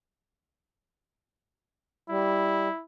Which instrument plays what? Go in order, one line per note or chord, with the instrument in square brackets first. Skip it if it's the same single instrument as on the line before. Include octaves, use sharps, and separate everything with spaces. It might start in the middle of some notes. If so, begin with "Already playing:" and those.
[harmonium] G3 [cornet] E4